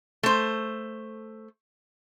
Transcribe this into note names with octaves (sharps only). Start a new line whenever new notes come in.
A3 C5